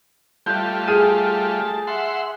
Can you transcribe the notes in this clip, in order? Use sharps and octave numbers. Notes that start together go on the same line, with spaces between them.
G3 A3 F4 F#6 G6
G#4 F6 D#7
A5
E5 F#5 C6